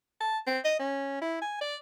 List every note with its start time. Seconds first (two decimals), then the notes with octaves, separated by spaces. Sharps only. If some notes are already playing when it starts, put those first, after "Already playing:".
0.21 A5
0.47 C4
0.65 D#5
0.79 C#4
1.21 E4
1.42 G#5
1.61 D5